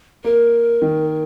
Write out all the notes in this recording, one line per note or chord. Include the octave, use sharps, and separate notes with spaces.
A#3 A#4
D#3